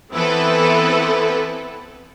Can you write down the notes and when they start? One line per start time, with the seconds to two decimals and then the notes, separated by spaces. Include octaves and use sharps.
0.13 E3 B3 C4 E4 A4 B4